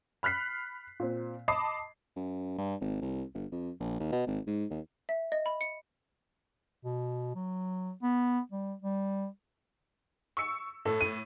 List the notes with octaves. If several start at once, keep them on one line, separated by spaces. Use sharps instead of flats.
B5 F6 F#6 B6 C7
A#2 C4
D#5 A5 B5 D6 D#6 C7
F#2
G2
G#1
C2
G1
F2
A#1
D#2
B2
G#1
G#2
D#2
E5
D#5
B5
C#7
B2
F#3
B3
G3
G3
C#6 E6 C#7
A2 A4
D#7